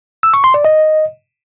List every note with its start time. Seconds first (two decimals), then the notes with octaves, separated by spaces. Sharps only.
0.23 E6
0.34 C#6
0.44 C6
0.54 D5
0.65 D#5